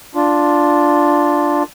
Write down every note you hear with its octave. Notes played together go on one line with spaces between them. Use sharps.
D4 F4